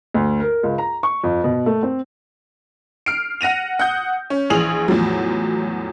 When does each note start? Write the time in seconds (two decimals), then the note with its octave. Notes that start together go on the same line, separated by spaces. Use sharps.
0.14 D2
0.40 A#4
0.63 C#2
0.78 A#5
1.03 C#6
1.24 F2
1.44 B2
1.66 A3
1.83 C4
3.06 F6 C7 D7
3.41 F#5 A#6 D#7 F7
3.79 F#5 D#6 G6
4.30 C#4
4.50 A#1 E3 G#4 D#6 F7 F#7
4.88 E2 A2 F3 F#3